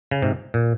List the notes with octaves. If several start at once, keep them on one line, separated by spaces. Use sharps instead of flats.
C#3
G#2 C3
A#2